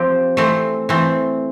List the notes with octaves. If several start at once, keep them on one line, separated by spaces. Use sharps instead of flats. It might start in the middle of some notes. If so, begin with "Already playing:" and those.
Already playing: F3 C4 G4
E3 A3 C4
E3 A3 C4